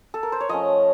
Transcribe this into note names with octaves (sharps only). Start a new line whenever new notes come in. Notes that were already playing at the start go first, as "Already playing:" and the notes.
A4
A#4
C5
C#5
F3 A3 C#4 D#5